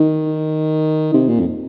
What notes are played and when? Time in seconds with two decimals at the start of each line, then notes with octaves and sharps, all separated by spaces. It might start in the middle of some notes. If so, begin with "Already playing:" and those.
Already playing: D#3
1.14 C3
1.29 A#2
1.40 F2